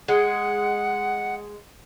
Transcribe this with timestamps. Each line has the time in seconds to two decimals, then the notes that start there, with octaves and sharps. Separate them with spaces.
0.08 G#3 F#5